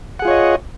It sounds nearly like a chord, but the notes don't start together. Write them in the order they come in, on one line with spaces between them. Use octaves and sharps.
F#5 G#4 F4 C#5 D#5